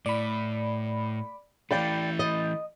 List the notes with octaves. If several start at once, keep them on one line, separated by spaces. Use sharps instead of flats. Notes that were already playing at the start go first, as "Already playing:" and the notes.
A2 D5 B5
E3 A3 D5 F5 G5 B5 G6 A6
D#5